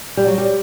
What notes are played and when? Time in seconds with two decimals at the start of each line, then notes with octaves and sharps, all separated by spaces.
0.17 G3
0.27 F#3
0.38 G3